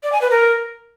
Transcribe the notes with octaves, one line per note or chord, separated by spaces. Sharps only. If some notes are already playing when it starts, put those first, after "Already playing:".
D5
G#5
B4
A#4